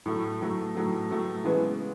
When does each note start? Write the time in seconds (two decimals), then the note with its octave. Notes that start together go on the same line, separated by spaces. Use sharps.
0.06 A2 F#3 A3
0.41 A2 F#3 A3
0.75 A2 F#3 A3
1.10 A2 F#3 A3
1.44 C#3 E3 G#3 B3